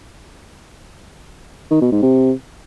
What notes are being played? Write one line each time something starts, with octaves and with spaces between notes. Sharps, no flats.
D#3
B2
G#2
C3